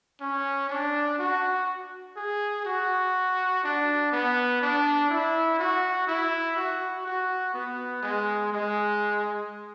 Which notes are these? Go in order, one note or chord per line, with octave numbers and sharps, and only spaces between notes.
C#4
D4
F#4
G#4
F#4
D4
B3
D4
E4
F#4
E4
F#4
F#4
B3
G#3
G#3